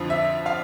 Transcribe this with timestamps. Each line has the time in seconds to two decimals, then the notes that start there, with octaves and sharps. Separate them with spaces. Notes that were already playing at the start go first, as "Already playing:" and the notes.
Already playing: F2 D3 F3
0.10 E5
0.46 F5